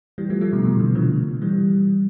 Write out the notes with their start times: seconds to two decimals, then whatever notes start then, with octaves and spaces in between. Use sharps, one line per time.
0.18 E3 G3
0.30 F3 A3
0.41 F3 A3
0.52 B2 D3
0.64 B2 D3
0.80 C3 E3
0.95 D3 F3
1.42 E3 G3